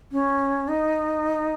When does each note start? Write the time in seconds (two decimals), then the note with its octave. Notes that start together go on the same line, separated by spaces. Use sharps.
0.12 C#4
0.68 D#4